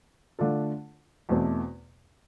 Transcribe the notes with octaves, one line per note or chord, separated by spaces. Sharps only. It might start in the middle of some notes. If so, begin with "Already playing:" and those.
D3 A3 D4 F4 A4
E2 B2 A3 C4